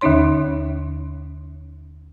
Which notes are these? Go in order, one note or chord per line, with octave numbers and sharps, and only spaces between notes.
D#2 D3 C#4 D#4 C#5 C6